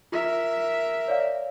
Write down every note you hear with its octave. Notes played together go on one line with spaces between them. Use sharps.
F4 A#4 E5
C#5 D5 F5